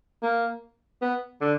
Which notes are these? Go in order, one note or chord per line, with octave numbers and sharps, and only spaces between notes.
A#3
B3
D3